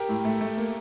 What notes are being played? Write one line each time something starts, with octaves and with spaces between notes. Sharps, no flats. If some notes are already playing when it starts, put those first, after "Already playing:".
Already playing: G4 A#4
A2
A3
A3
A#3